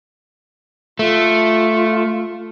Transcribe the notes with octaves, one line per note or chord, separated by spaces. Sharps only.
A3 F4